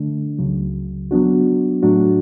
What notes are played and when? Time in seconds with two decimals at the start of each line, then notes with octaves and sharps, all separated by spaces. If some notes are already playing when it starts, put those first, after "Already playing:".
Already playing: D3 A3 D4
0.38 C#2 C#3 F#3
1.11 F#3 B3 D4 F#4
1.82 A2 F#3 A3 D4 F#4